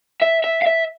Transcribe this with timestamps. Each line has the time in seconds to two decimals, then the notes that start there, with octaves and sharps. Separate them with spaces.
0.22 E5
0.44 E5
0.62 F5
0.66 E5